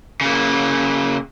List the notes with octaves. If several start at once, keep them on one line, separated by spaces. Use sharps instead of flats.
C#3 A#3